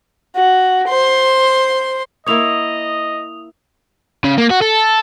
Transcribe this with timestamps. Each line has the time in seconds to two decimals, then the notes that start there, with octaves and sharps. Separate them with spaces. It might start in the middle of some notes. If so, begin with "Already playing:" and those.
0.35 F#4
0.88 C5 C6
2.27 A#3 E4 C#5 D#5 D#6 F7
4.24 C#3
4.38 A#3
4.50 F#4
4.62 A4